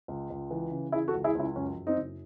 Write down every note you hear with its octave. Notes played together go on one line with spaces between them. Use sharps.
C#2
C#2
E3
C#3
E3 E4 G#4
F#4 A4
C#2
E4 G#4
C#2 C#4 E4
F#2 C#4
F#2
C4 D#4
F#1